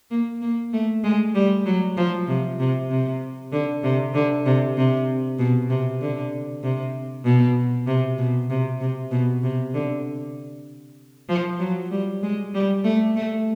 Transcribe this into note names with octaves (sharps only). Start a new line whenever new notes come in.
A#3
A#3
A3
G#3
G3
F#3
F3
C3
C3
C3
D3
C3
D3
C3
C3
B2
C3
D3
C3
B2
C3
B2
C3
C3
B2
C3
D3
F3
F#3
G3
G#3
G3
A3
A3